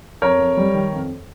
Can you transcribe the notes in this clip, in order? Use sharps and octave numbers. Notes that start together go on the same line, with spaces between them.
F2 A#4 C#5
F2
G3
D#3
F2